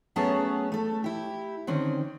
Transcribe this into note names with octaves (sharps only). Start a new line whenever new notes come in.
F#3 A3 B3 C#4 G#4 A5
A3 A4
E4 G4
D3 D#3 C4 C#4